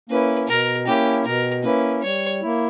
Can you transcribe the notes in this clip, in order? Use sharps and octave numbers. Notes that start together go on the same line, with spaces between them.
A#3 C#4 E4 B4
B2 A#4
A#3 C#4 E4 G4
B2 A#4
A#3 C#4 E4 B4
G3 C#5
A#3 E4